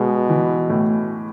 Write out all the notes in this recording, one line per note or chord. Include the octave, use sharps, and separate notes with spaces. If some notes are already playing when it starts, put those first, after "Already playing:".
Already playing: B2 G#3
E3
A2